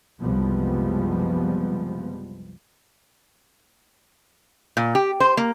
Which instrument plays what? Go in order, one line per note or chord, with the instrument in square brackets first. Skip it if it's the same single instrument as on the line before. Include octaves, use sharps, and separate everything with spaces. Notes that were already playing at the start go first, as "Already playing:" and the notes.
[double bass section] F#1 C2 F3 G3 G#3 B3
[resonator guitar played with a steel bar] A#2
G4
C5
A#3